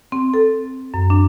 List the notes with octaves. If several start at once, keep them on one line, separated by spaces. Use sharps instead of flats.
C4
A4
F#2
D4